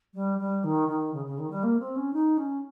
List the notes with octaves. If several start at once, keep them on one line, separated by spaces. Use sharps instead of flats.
G3
G3
D#3
D#3
C#3
C#3
D#3
G3
A#3
C4
C#4
D#4
C#4